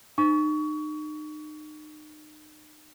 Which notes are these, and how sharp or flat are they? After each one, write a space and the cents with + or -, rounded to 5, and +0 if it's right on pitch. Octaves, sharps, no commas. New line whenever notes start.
D#4 -35 C#6 +30